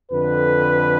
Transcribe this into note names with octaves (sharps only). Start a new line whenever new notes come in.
F2 D3 B4